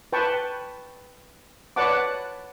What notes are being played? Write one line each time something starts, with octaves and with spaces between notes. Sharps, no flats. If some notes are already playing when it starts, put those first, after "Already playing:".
B4 G5 A5 C#6
B4 C#5 D5 F#5 A5 D6